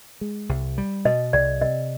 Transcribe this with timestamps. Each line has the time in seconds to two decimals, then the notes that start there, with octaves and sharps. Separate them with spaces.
0.21 G#3
0.49 C2
0.78 G3
1.05 B2 D#5
1.33 C2 D5
1.61 C3 D#5